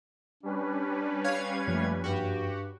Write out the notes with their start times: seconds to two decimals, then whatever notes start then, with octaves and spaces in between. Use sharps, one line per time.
0.43 G3 C#4 D4 B4
1.24 C#5 F5 G#6
1.67 F#2 F3 A3 A#3
2.04 G2 F#4 G4